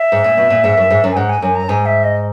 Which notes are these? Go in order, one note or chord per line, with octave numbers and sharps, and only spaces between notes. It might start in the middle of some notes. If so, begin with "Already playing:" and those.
Already playing: E5
G#2
A#2
B2
A#2
G#2
F#2
G#2
F#2
G#5
G#2 F#5
G#5
F#2 G#5
A#5
G#2 G#5
E5
D#5